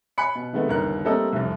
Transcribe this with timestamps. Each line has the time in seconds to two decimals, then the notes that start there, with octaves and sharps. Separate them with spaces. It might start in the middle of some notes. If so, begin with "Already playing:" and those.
0.18 G#5 B5 F#6 C#7
0.35 B2
0.53 C3 D#3 G#3 A3 B3
0.69 G1 D#2 C#3 A#4 F#6
1.05 G3 A3 A#3 C4 A4 D#5
1.32 F1 C2